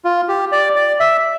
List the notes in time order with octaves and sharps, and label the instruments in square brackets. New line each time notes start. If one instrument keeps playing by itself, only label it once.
[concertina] F4
G4
D5
D5
E5